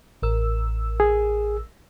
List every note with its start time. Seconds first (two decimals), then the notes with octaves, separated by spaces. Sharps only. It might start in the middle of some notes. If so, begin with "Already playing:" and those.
0.22 A1 A#4 E6
1.00 G#4